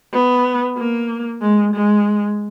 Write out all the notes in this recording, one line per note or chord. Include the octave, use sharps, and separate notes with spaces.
B3
A#3
G#3
G#3